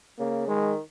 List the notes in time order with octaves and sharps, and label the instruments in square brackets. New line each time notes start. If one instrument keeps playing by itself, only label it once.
[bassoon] C#3 [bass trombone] A#3
[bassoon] D#3 [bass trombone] G#3